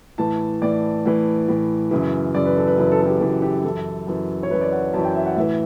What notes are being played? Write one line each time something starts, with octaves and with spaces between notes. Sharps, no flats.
A2 E3 A5
A2 E3 D5
A2 E3
A2 E3
F#2 C#3 E3
F#2 C#3 E3 D5
B4
A4
B4
F#2 C#3 E3 B4
A4
A4
G4
F#2 C#3 E3 F#4
G4
F#2 E3 A4
F#2 E3
C#5
F#2 E3 B4
D5
F#5
F#2 E3 A5
G5
E5
F#5
A2 E3 E5